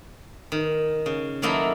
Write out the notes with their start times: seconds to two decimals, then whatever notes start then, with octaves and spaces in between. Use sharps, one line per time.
0.52 D#3
1.06 C#3
1.42 D#3 F#3 A#3 D#4 E4 A4